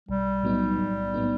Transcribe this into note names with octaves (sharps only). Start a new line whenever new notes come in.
B1 G3
A2 F#3 B3 D#4
B1
A2 F#3 B3 D#4